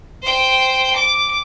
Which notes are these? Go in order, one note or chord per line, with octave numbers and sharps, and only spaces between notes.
C5 G5
D6